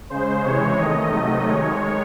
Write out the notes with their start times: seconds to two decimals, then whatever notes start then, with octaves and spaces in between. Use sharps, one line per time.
0.10 C#3 G#3 C5
0.44 C3 E3 G#3 C#5
0.78 D#3 A3 D#5
1.12 C3 D#3 F#3 A3 D#5
1.46 D#3 G#3 C#5